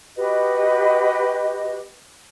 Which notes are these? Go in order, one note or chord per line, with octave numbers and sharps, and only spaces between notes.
F#4 G4 B4 D#5